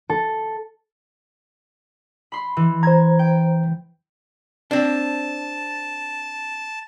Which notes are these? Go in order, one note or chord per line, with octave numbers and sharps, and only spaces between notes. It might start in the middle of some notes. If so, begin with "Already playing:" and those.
A4
B5 C6
E3
C5 A#5 G#6
G5
C4 D4 A5